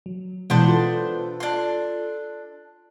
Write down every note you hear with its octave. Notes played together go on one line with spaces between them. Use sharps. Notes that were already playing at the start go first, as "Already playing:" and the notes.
F#3
B2 E3 G#3 B3 D4 C5
F4 A4
D4 C6